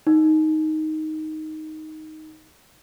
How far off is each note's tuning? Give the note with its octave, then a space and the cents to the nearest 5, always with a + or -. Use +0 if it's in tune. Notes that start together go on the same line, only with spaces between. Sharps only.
D#4 +5